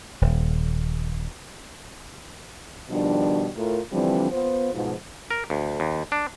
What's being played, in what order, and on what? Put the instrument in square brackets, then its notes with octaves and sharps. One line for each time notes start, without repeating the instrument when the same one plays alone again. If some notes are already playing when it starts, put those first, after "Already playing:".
[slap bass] D#1
[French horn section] B2 D#3 F3 G3 D4
A2 A3 F4 A#4
D3 E3 F3 G3 C4 D4
B3 F4 C5
G#2 B2 F3
[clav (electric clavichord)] A#4
D2
D#2
D4